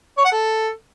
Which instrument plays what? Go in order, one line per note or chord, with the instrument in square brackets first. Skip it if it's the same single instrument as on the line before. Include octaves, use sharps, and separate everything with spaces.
[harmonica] C#5
F#5
A4